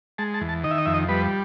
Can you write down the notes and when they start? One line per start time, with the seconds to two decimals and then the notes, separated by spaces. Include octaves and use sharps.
0.18 G#3 A5
0.34 A5
0.41 E2
0.49 A5
0.64 D#3 D#5
0.71 E5
0.78 D#5
0.86 F2 E5
0.94 D#5
1.09 G3 B4